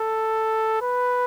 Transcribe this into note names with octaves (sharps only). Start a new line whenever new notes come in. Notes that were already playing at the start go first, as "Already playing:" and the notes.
Already playing: A4
B4